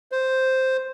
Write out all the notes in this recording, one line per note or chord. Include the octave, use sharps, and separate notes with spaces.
C5